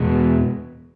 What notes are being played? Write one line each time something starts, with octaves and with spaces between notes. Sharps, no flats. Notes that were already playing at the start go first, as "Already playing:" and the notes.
Already playing: E2 B2 G#3 B3